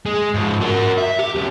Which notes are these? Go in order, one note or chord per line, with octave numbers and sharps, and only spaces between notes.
G#3
G#2 F3
F#4 A#4
E5
G4
C#3 F#3